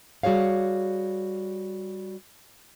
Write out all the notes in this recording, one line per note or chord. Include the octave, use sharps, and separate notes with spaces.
G3 F#4 G#4 C#5 F5